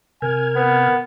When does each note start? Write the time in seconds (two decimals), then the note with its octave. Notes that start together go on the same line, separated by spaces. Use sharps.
0.22 C3 A#4 G#5 F6 G#6
0.56 B3